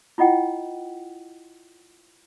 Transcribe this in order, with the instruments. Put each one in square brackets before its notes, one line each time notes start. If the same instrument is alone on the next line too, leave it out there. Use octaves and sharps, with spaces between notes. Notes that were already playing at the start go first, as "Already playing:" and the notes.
[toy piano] E4 F4 D#5 F#5 G5